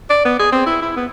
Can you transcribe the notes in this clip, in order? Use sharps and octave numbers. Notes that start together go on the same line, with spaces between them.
D5
B3
G#4
C4
E4
E4
B3